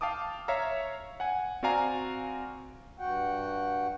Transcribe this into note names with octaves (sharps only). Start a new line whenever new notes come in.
F5 G5 A5 D6 D#6
C#5 E5 F5 A#5
F#5 G#5
C4 F#4 D5 F5 G#5 A#5
G2 F#4 F#5 G5